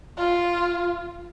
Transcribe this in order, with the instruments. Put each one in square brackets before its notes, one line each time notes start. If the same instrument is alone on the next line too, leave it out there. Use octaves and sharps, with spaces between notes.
[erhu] F4